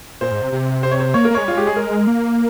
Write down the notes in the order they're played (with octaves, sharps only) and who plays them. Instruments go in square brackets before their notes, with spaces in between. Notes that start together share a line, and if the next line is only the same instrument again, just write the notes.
[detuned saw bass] A#2 [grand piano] C5
[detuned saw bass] G#2
C3
C3
[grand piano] C5
C#5
C5
[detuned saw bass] A#3 [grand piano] C#5
[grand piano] A#4
[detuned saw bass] A#3
[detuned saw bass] G#3 [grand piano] C#5
[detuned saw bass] G3
[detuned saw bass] G#3 [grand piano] F4
[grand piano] G4
G#4
A#4
[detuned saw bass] A#3